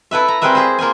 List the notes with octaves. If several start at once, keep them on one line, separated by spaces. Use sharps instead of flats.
E4 A4 B4 E5
A#5
G3 C4 G#4 A#4 B4 E5
G#4 C5
A#3 F4 G#4 G#5